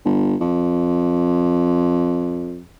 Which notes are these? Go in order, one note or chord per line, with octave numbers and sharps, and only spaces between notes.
G1
F2